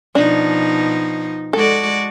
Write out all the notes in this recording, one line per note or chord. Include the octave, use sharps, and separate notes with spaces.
B2 F3 D4 D#4
G#3 F#4 A4 D5